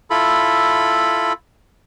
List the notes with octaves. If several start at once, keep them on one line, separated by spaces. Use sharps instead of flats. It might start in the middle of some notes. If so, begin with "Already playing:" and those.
E4 F4 A4 B5